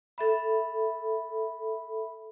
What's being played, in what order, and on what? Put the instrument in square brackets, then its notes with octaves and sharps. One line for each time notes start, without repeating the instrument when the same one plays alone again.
[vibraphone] A4 E5 B5